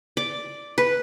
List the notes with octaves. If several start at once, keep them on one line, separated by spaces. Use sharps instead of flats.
D5
B4